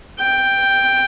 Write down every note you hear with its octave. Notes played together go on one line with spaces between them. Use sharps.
G5